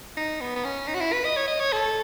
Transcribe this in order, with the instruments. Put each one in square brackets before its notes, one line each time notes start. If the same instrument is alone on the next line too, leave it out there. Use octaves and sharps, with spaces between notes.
[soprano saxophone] D#4
B3
B3
C#4
D#4
F#4
E4
B4
D#5
C#5
D#5
C#5
A4